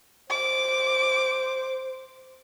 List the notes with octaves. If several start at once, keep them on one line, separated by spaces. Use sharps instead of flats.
C5 D6